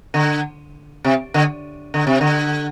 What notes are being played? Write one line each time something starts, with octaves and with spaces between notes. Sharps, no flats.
D3
C3
D3
D3
C3
D3